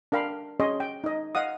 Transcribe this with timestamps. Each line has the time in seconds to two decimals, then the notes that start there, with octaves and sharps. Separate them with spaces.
0.12 D4 A#4 F5 G5 B5
0.60 C#4 G#4 C#5 D#5 C6
0.80 G5
1.04 D#4 D#5
1.35 D#5 F5 F#5 D#6